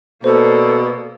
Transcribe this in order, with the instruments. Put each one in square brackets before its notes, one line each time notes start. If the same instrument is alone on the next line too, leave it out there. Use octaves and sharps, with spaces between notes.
[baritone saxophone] B2 [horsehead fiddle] A#3 D5 [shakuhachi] A4 [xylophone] C5